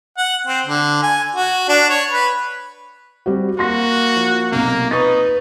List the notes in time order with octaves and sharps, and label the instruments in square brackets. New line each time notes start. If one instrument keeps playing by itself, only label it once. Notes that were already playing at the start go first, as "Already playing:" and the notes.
[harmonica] F#5
C4
D3
G#5
F#4
D4
C#5
B4
[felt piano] G3 C4 F#4
[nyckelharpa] A#3 [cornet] F#4 [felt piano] C6 A#6
[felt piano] F3
[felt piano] B1 C3 [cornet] A#3
[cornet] D#4 [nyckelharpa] B4 [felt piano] C#6 D#6 A6